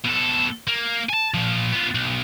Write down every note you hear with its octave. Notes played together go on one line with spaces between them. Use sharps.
B2 A4
A#3
G#5 A5
A#2 F3
B3 F4
B1